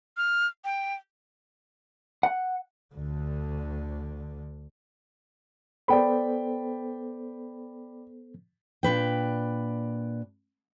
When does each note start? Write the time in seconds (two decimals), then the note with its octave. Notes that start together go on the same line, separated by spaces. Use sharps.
0.17 F6
0.64 G5
2.23 F#5
2.95 D2 D3
5.88 B3 A4 C5 D5 G5 B5
8.83 A#2 D4 B4 G5